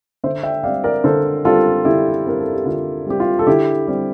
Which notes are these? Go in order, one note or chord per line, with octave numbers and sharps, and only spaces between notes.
D3 C5 E5
E5 G5
G3 C4 D5 F5
A#4 D5
D3 A4 C5
G3 C4 F4 A4
D3 E4 G4
G3 C4 A#4
A4
G4
D3 F4
G3 C4 G4
F4
A4
D3 E4 G4
G3 C4